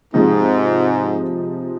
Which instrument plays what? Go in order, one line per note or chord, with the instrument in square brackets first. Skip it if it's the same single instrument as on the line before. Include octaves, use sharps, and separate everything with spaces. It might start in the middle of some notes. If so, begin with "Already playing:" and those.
[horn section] G#2 [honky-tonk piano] C3 F3 G#3 D#4